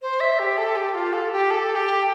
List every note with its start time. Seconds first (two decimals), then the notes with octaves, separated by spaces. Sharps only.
0.02 C5
0.20 E5
0.39 G4
0.58 A4
0.76 G4
0.95 F4
1.13 A4
1.32 G4
1.51 A4
1.75 G4